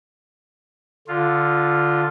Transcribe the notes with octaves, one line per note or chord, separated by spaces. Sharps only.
D3 F4